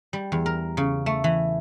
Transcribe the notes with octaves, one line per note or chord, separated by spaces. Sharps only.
G3
E2
A#4
C#3
A3
E3